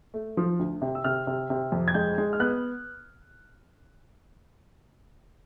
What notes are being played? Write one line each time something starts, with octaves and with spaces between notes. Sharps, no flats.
A3
F3
D2
C3
E6
C3 F6
C3
C3
F2
G#6
G#3 G6
G#3
F6
B3 F#6